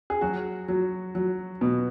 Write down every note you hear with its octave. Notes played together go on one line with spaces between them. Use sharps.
G#4
F#3 F#4
F#3
F#3
B2